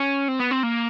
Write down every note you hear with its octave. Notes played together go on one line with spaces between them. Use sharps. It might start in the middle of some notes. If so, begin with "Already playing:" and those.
Already playing: C#4
C4
B3
C4
A#3